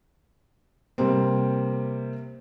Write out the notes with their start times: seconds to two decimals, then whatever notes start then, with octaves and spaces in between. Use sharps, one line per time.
0.98 C3 G3 A#3 C4